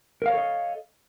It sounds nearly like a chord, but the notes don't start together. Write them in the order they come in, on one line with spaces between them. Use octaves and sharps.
A#4 F5 C#5 A4 D#5